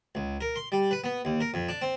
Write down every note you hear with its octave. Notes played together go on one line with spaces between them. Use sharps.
C#2
A#4
C6
G3
B4
B3
D#2
A#4
F2
D4
C4